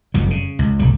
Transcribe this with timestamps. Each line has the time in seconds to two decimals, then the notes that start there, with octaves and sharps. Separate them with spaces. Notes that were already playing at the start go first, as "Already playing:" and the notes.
0.14 F#1 F2 G3
0.30 C#3
0.59 C#2
0.79 D1 B1 G3